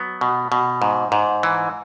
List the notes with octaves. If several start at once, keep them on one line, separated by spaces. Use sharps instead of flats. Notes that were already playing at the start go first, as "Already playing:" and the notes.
Already playing: F#3 B3
B2
B2
G#2
G#2
E3